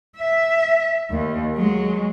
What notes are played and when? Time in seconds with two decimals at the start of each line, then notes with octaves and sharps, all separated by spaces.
0.18 E5
1.10 D#2
1.55 F#3 G#3